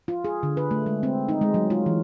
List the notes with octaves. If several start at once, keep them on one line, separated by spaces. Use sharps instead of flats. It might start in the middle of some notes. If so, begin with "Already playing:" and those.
F4
G#4
D3
B4
A3
G#3
C4
D#4
G#3
F#3
F4
E3